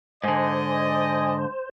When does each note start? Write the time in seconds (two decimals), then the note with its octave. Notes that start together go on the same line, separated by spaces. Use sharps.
0.24 G#2 D3 C5 D5 D#5 G#5